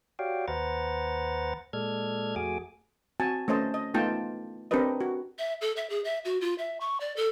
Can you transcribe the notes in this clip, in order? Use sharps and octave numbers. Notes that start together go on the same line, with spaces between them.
F#4 G4 C#5 D5 F5 G5
D#2 B4 C5 F#5 A#5 A6
A#2 G#3 A4 D5 F6 G#6
F2 A3 F#4 G#4 G#5 D6
C4 F#4 G#5 A5
A3 C#4 C5 D#5 A5
D#5
A3 B3 D#4 F4 G5 A5
C4 D4 G4 A#4 B4 D#5
F#4
E5
A4
E5
G#4
E5
F#4
F4
E5
C#6
D5
A4